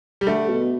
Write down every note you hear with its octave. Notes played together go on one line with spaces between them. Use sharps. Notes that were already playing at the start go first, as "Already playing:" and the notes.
G3
D3 A3
B2